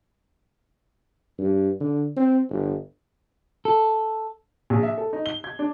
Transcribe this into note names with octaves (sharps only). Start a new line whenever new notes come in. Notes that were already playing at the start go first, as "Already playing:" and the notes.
G2
D3
C4
G1
A4
A#1
E5
A4
D#4
G7
G#6
D4